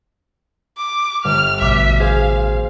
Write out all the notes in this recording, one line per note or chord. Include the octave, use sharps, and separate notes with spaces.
D6
G1 F6
A1 B2 E5 D6 F#6
G#4 C5 F5